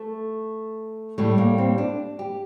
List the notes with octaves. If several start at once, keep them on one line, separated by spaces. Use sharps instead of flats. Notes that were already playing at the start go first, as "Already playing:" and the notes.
Already playing: A3
A2 G3 A3
A#3
C4
D4
G4